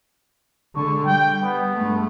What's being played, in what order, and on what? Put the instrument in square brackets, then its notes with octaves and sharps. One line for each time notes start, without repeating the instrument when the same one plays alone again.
[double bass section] D3 G#3 [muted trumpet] C#6
[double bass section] G3 [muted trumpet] G5
[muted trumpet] B3
[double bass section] G2 G#3 A3